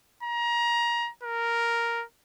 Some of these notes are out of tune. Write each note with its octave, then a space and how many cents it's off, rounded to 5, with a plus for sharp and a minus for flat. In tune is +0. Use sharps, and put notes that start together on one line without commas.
A#5 +25
A#4 +0